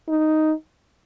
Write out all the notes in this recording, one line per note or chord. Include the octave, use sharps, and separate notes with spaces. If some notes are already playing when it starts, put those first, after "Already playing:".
D#4